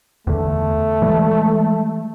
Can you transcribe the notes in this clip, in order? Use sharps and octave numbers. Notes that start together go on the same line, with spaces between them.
E2 D3 A3
E3 G3 G#3